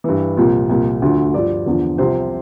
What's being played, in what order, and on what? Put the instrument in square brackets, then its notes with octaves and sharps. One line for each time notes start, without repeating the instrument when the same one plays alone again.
[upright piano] G2 E3
C2 A#2 F3
C2 A#2 F3
D2 D3 F3
G2 F3 D5
E2 D3 F3
C2 C3 F3 C5